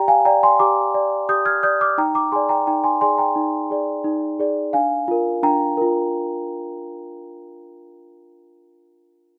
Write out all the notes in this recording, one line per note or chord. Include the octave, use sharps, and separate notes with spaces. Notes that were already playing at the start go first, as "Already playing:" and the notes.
Already playing: G4 D5 G5 A#5
F5 G#5
D5 G5 A#5
G#5 C6
G4 A#5 D6
D5
G4 D#6 G6
F6 G#6
D5 D#6 G6
D6 F6
D#4 G5 A#5
A#5 D6
G#4 D5 G#5 C6
G5 A#5
D#4 G5 A#5
G#5 C6
G#4 D5 G#5 C6
G5 A#5
D#4
G#4 D5
D#4
G#4 D5
D4 F5 G#5
F4 A#4
D4 G5 A#5
F4 A#4